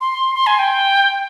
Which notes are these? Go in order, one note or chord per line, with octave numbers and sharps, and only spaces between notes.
C6
C6
G#5
G5